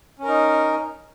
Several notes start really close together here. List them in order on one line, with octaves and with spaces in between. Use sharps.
C#4 A#4 D#4